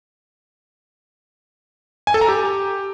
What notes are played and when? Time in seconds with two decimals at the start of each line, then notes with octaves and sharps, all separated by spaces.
2.07 G#5
2.14 A4
2.21 A#5
2.28 G4